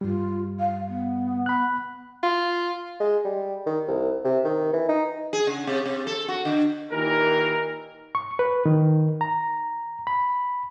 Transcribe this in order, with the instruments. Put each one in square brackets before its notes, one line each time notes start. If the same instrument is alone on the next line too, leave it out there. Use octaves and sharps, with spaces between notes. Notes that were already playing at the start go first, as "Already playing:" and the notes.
[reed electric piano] G2 G3 [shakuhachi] F4
[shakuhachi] F5
B3
[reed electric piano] B5 F#6
[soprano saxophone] F4
[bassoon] G#3
G3
D#3
C2
C3
D#3
E3
D#4
[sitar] G#4
C#3
C3
C3
A4
F#4
D3
[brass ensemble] A#2 D#3 E3 A#3 G4 A#4
[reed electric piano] C#6
B4
D#3
A#5
B5